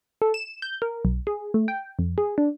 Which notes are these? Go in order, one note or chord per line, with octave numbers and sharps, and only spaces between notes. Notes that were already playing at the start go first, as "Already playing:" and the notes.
A4
E7
G6
A#4
B1
G#4
A3
G5
F2
G#4
D4